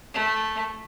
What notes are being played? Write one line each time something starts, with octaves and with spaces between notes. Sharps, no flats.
A3